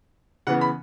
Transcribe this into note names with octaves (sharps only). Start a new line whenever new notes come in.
C#3 E3 B3 F#5
B5